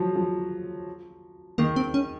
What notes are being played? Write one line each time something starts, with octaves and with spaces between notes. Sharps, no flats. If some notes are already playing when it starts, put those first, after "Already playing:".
Already playing: F3 F#3
F3
D#3 A#3
C4
C#4